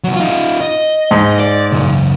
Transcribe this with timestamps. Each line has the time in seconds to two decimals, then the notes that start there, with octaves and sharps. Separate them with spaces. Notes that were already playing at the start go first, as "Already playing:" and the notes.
0.04 C2 F#3
0.16 D#4 F4
0.61 D#5
1.11 G#2
1.40 D5
1.72 C#2 F#2